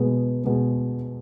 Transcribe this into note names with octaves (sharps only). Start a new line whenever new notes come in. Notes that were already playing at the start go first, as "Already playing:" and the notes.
Already playing: B2 G#3 B3
B2 G#3 B3